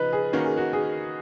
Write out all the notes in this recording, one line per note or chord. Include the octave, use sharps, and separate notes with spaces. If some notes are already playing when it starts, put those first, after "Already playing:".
Already playing: C#3 F3 D#4 B4 D#5
G#4
D#3 A#3 C#4 F#4
G#4
F#4
G#4